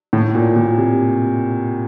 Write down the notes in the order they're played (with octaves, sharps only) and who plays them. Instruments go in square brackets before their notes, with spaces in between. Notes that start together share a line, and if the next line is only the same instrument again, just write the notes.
[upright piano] A2
A#2
A#2
C3